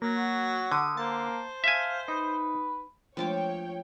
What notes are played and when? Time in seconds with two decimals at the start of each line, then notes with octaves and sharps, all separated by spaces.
0.02 F#3 A#3
0.17 F#4
0.72 D3 D#6
0.97 A#3 C5 A5
1.64 E5 F5 G#5
2.08 D#4 B4
3.17 F3 G#3 A3 D4 C#5 G5 A5 D6